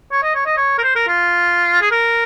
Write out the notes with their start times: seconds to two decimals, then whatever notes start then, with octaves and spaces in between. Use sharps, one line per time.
0.12 C#5
0.23 D#5
0.35 C#5
0.46 D#5
0.57 C#5
0.78 A#4
0.83 C5
0.96 A#4
1.08 F4
1.81 G#4
1.91 A#4